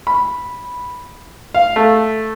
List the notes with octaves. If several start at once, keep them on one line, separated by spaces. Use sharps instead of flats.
B5
F5
A3